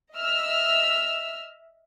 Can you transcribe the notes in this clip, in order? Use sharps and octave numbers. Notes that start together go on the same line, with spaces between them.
D#5 E5 E6 F6